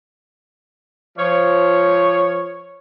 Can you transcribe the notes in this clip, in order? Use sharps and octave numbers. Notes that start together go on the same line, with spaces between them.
F3 C#5